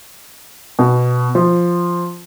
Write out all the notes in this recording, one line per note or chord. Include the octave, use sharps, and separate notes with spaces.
B2
F3